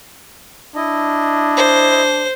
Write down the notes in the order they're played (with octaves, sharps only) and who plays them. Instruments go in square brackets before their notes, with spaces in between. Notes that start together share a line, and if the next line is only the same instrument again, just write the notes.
[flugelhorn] D4 [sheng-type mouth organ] E4 D#5
[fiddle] C5